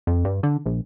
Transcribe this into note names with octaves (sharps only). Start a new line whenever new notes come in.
F2
G2
D3
A#1